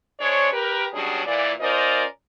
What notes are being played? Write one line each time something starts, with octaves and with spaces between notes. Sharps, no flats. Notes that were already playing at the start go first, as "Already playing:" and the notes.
G#3 D4 C5 C#5
G4 A#4 B4
B2 F#3 G3 C#4 D4 G#4
A#2 E3 D5
C#4 F4 A#4 C5 D5 D#5